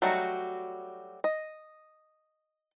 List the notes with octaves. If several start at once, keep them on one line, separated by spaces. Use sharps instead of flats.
F#3 G3 A3 D#4 F#4
D#5